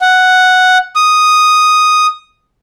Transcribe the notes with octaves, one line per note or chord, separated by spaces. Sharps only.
F#5
D#6